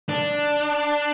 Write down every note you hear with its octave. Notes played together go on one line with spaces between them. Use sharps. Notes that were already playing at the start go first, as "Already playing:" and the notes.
D4